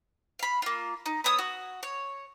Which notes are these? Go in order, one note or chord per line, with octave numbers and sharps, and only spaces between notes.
F5 B5
A#3 F4
D#4
B3 C#5 D#6 E6
F#4
C#5